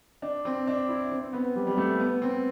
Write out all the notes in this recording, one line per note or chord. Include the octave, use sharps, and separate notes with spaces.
D4
C4
D4
E4
C4
B3
G3
G3
A3
B3
C4